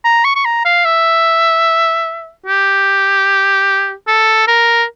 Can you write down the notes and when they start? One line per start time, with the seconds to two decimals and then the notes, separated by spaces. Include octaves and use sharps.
0.05 A#5
0.25 C#6
0.36 C#6
0.45 A#5
0.65 F5
0.85 E5
2.46 G4
4.08 A4
4.48 A#4